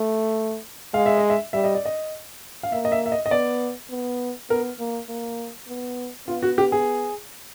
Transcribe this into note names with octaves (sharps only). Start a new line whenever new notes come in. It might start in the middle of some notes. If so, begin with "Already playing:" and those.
Already playing: A3
G#3 F5
E5
D#5
E5
G3 E5
D#5
D5
D#5
F5
A#3 E5
D#5
E5
E5
D#5
D#5
B3 D5
B3
B3 A#4
A#3
A#3
B3
B3 F4
F#4
G4
G#4